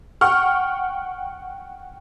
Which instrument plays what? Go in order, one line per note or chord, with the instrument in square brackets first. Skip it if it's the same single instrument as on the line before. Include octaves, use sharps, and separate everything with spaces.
[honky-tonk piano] F#5 G5 C#6 F6